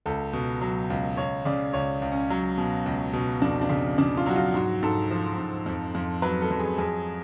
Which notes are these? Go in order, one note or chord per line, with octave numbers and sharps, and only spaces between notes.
C#2 A4
B2
F#3
C#2
C#2 C#5
C#3 D5
C#2 C#5
C#2
C#4
F#3
B2
C#2
B2
F2 D4
D4
C#3
C#3 D4
F4
F#3 F#4
F4
G#2 F#4
G#2 A4
F3
G#2
F2
F2
F#3 B4
A4
F2
G#4
F2 G#4